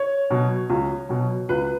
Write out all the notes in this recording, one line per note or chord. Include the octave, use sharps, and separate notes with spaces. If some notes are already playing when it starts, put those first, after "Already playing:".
Already playing: C#5
B2 F#3
C#2
B2 F#3
C#2 B4